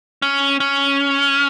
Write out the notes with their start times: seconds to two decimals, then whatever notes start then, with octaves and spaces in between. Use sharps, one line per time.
0.22 C#4
0.60 C#4